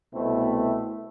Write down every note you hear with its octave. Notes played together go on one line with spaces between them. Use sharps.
C2 B2 A3 C4 E4